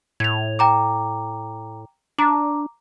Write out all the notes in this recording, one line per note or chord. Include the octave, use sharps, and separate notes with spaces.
A2 G#6 F7
G5 A#5 D6
D4 A#5 D6